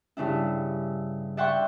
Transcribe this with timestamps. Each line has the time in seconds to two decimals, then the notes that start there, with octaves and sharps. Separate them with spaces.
0.17 G2 C#3 D4 E4
1.37 D5 E5 F#5 G5 C6 C#6